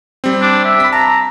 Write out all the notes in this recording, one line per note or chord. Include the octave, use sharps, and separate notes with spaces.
G3 C4
D4
E5
B5 B6
A5 A#5